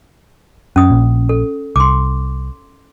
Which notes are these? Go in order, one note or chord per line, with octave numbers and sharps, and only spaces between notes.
F#2 C#4 D#6
A#1 A#2
A4
C2 C6 D6